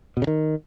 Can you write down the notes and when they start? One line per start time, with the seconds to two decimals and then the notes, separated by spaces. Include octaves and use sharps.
0.17 B2
0.22 C#3
0.27 D#3